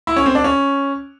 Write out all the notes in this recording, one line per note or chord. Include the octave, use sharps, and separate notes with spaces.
E4
C#4
C4
D4
C#4